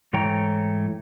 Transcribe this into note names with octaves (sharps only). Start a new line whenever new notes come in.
G#2 E3 A3 C#5 G5 A#5